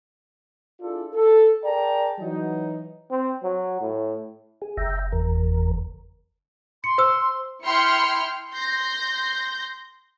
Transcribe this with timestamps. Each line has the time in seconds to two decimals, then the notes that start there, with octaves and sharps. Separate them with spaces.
0.81 D4 E4 F4 G#4 A4 D5
1.14 A4
1.64 G#4 A#4 D5 G5 A5 A#5
2.20 E3 F#3 D#4
3.11 C4
3.43 F#3
3.81 A2
4.62 G#4
4.77 F#1 E5 G5 A#5
5.12 E2 A#4
6.84 C6 C#7
6.98 C5 E6
7.63 E4 G5 C6 F6 C#7
8.51 C6 G6 A#6